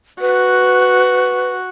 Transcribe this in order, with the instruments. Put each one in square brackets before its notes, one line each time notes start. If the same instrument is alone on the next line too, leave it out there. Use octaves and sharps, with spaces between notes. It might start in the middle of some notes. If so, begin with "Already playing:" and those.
[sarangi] F#4 [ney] B4